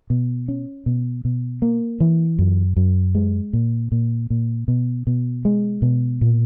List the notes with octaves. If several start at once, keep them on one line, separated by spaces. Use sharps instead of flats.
B2
C#4
B2
B2
A#3
E3
F#2
F#2
G#3
A#2
A#2
A#2
B2
B2
G#3
B2
A#2